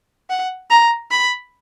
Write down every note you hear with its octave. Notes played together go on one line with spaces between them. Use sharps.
F#5
A#5
B5